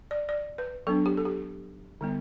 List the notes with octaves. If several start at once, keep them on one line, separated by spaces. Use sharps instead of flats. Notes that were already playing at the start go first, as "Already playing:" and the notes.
D5
D5
B4
F#3 B3 D4 A4
G4
A4
G4
D3 G3 B3